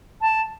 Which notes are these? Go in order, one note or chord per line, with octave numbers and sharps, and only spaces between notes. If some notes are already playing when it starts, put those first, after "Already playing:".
A5